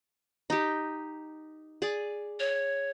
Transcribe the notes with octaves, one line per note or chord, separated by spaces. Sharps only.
D#4 G4
G#4 D5
C#5